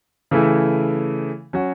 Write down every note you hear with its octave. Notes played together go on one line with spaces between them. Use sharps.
C#3 E3 A3 E4
F#3 C#4 F#4